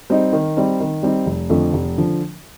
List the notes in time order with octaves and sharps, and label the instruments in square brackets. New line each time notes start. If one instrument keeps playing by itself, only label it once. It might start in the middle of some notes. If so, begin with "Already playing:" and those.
[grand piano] G3 C4 D#4
D#3
G3 C4 D#4
D#3
G3 C4 D#4
F1
F2 D3 F3 A3
F1
D3 F3